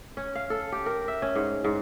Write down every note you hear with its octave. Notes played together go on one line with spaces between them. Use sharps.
C#4
F5
A4
G4
A#4
E5
C#4
G#2
G#2